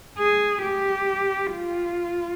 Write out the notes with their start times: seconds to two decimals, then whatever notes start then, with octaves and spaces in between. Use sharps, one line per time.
0.18 G#4
0.64 G4
1.54 F4